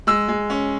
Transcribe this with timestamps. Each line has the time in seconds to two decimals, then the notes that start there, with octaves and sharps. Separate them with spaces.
0.07 G#3 E6
0.28 G#3
0.50 C#4